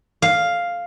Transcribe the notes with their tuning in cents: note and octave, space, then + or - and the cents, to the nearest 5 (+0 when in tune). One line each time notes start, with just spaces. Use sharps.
F5 +0